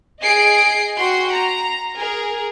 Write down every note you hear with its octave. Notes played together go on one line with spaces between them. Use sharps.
G#4 D#5 C7 D7
F#4 G5 C6
A#5
G#4 A#4